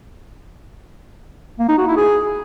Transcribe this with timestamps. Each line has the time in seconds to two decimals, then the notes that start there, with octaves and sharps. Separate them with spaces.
1.59 A#3
1.69 D#4
1.78 F#4
1.87 E4
1.97 G#4